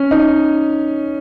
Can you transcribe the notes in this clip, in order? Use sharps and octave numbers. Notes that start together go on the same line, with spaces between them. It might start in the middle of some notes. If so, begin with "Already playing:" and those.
Already playing: C#4
D#4